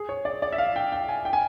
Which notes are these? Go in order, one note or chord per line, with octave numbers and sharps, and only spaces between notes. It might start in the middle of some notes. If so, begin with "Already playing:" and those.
Already playing: G#4
C#5
D5
D5
E5
F5
G5
G5
G#5
G5
G#5